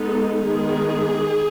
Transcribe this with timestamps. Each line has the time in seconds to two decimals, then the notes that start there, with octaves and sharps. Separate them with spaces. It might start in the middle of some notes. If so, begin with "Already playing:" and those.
Already playing: G#3 B3 D#4 A4
0.43 D#3 G#3 B3 G#4